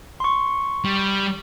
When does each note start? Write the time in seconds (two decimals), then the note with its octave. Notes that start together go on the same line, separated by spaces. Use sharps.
0.20 C6 C#6
0.85 G3